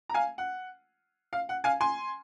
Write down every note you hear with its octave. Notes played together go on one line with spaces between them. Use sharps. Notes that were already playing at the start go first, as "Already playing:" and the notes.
A#5
F5 G#5
F#5
F5
F#5
F5 G#5
G#5 C6